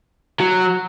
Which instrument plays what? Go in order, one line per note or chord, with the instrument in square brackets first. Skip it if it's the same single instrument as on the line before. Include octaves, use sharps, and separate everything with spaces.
[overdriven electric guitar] F#3